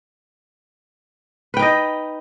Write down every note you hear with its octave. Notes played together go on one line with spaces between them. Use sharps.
D#4 B4 D#5 G5